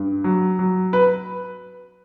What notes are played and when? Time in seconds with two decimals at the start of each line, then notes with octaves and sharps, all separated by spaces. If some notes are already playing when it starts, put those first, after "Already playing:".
Already playing: G2
0.24 F#3
0.59 F#3
0.93 B4